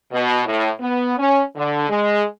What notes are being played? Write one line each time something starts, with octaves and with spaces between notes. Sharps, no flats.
B2
A2
B3
C#4
D3
G#3